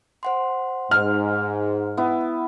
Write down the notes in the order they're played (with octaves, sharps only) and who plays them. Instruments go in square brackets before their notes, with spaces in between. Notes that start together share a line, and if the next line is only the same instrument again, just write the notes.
[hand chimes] C5 F#5 C6
[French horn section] G#2 [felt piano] F6
[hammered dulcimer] B3 E4